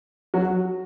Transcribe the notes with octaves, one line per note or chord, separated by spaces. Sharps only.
F#3 F#4